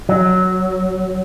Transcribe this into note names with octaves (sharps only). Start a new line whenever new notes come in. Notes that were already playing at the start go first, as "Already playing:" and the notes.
F#3